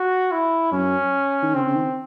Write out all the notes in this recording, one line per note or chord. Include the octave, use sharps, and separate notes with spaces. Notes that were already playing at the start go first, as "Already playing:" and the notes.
Already playing: F#4
E4
F#2 C#4
D#3
C#3 C4
C#3
D#3